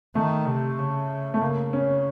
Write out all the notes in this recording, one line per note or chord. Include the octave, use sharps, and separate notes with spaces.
D#3 A3
C3
C#3
A3
C#3 A#3
C#4